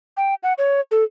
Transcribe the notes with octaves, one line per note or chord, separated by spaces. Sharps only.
G5
F#5
C#5
A4